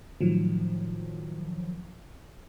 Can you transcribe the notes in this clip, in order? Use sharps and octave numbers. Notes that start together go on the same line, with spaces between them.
A2 D#3 F3 F#3